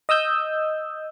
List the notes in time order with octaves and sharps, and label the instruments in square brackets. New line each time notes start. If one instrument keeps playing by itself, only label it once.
[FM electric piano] D#5 D#6 E6 G6